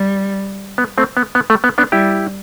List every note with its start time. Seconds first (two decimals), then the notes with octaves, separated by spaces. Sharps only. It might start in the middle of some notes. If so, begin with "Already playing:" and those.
Already playing: G3
0.78 B3
0.98 A3 C4
1.17 B3
1.35 B3
1.50 A3
1.64 B3
1.78 B3 D4
1.92 G3 E4 G4